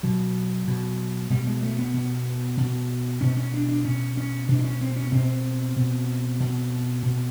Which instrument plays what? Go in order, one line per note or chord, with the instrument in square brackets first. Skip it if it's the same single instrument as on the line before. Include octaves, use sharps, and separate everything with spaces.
[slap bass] B2 F#3
B2
B2 G3
G#3
A3
B3
B2
B2
B2 C#4
C#4
D4
D4
B2 C#4
C#4
B2 D4
D4
C#4
C4
C#4
B2 C4
B2
B2
B2